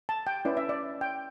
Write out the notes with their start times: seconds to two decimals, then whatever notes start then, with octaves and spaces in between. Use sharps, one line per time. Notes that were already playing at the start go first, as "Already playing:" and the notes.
0.09 A5
0.27 G5
0.45 C#4 E4 B4 D5
0.57 E5
0.69 D5
1.01 G5